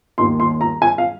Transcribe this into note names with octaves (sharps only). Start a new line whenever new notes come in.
D#2 D#3 A#3 C6
C6
A#5
G#5
F5